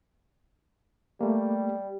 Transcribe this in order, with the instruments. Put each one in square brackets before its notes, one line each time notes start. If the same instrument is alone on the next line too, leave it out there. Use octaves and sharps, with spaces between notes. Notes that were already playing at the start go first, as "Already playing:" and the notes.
[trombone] G3 [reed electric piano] A3 A#3